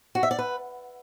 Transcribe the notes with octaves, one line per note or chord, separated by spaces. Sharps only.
F#4
E5
D5
B4